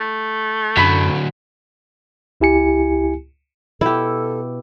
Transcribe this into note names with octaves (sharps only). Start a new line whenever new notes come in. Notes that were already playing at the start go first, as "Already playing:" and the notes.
A3
F#2 D3 F#3 B5 B6
C#2 E4 G4 G#5 C#7
B2 E4 G4 A4